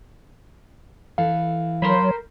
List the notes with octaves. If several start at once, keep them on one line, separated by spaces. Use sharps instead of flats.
E3 A4 F5
F#3 A#4 C5 C#5 B5